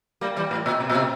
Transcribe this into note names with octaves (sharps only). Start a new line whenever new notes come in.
G3 A#3
E3 G3
A2
A#2
C3
A#2
C3